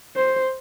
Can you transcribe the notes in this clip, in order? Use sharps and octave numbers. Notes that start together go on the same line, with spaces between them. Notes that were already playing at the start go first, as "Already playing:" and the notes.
C5